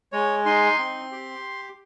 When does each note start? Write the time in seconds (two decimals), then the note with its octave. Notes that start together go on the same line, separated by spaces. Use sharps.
0.12 G#3 C#5
0.45 D#4 C6
0.78 C4
1.12 G4